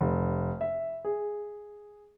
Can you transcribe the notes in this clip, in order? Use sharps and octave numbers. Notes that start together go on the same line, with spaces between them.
F1
E5
G#4